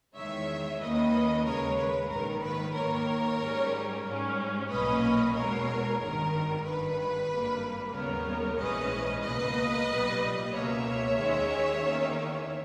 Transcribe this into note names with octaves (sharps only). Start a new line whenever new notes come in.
E2 D#3 G#3 C#5 E5
D#2 D#3 A#3 C#4 B4 D#5
D#2 C#3 G#3 A#4 C#5
B4
A#1 G#2 D#3 A#4
B4
D#2 D#3 A#3 A#4 C#5
G#2 G3 C#4
G#2 G3 C#4
B1 A#2 A#3 C#4 B4 D#5
E2 B2 G#3 A#4 C#5
G#1 G2 D#3 A#4
G#1 G2 D#3 B4
G#1 G2 G3 A#3
D#2 C#3 G3 B3 A#4 C#5
A#1 G#2 E3 G#3 C#4 B4 D#5
C#2 B2 A#3 B4 D#5
B1 A#2 G3
C#2 B2 A#3 C#5 E5
D#2 D#3 G#3 C#4
E2 D#3 A#3 C#4